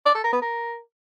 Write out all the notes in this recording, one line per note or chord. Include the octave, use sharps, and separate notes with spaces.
D5
A4
A#4
B3
A#4